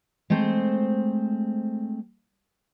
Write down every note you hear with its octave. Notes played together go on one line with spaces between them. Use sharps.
G#3 A3 C4 C5